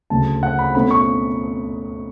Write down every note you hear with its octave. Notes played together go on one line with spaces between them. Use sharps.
D2 C#3 F#3 A5
F#5
B5
B2 A3 C#4 B5
C#6